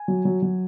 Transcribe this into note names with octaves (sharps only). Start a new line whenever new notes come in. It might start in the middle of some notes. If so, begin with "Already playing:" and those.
Already playing: G#5
F#3
F#3
F#3